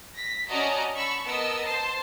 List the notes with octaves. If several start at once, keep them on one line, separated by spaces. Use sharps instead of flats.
A#6 B6
C#4 F#4 D5 D#5 A5 A#5
A5 B5 C#6 E6
B3 A#4 D#5 A5 E6
C5 A5 C7